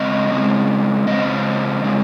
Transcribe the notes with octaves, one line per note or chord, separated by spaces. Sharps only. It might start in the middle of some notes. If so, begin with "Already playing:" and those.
Already playing: C#3 G#3 C4 D#5
C#3 G#3 C4
C#3 G#3 C4 D#5
C#3 G#3 C4